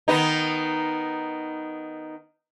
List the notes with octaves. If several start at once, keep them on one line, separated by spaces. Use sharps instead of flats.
D#3 B3 D#4